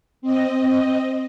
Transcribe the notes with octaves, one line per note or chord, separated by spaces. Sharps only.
C4 D#5